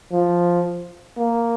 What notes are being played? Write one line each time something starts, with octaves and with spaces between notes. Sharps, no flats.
F3
A#3